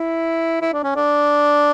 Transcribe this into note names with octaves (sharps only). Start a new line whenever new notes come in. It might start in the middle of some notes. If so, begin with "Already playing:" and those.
Already playing: E4
E4
D4
C#4
D4